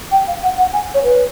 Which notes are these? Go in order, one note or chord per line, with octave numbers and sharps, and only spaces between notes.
G5
F5
F#5
F#5
G#5
C#5
B4